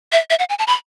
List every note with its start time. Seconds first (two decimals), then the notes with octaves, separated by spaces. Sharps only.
0.12 E5
0.30 E5
0.39 F#5
0.49 G#5
0.59 A5
0.67 B5